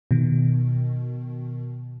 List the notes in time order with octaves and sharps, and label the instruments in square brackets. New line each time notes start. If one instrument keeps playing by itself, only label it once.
[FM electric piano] B2 D#3